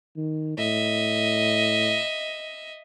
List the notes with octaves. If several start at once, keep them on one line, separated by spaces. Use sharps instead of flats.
D#3
A2 D#5 E5